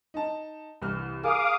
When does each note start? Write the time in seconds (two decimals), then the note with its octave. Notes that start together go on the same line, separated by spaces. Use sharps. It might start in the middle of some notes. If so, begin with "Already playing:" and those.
0.14 D#4 A5
0.82 C2 E3 F6
1.23 G#4 A#4 F5 D6 D#6